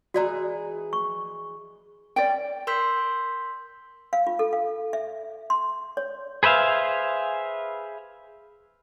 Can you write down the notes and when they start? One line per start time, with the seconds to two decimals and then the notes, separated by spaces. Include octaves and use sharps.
0.14 E3 G#3 F#4 G#4 D5 A#5
0.93 C#6
2.16 G3 C#4 F4 D5 G5
2.67 A#4 C6 E6 G6 B6
4.13 F5
4.27 F4
4.39 A4
4.53 F5
4.93 E5
5.50 C6
5.97 C#5
6.43 G#4 B4 C5 E5 F5